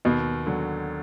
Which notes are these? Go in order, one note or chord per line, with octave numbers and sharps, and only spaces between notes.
D#2 B2
D3 F#3